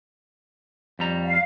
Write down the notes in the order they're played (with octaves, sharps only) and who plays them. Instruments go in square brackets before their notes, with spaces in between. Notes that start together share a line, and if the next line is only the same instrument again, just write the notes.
[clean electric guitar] F2 G3 A#5
[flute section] F5